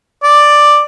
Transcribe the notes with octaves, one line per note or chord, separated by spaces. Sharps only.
D5